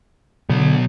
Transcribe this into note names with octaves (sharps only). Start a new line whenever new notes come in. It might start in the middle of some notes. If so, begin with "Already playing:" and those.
B2 D3 F#3